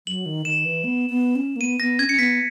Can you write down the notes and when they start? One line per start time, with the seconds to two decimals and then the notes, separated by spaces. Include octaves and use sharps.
0.07 F#3 F#7
0.26 D#3
0.45 D#3 E7
0.65 E3
0.84 B3
1.10 B3
1.36 C#4
1.56 A#3
1.61 B3 D#7
1.80 B3 A#6
1.99 C#4 G#6
2.09 C#4 C#7
2.19 B3 B6